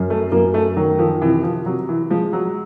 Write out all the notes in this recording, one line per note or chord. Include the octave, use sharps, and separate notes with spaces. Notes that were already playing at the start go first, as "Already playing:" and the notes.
Already playing: F#2
A3
F#2 A#3
A3
D#3 F#3
F3
C3 E3
F3
C3 F#3
E3
F3 G#3
F#3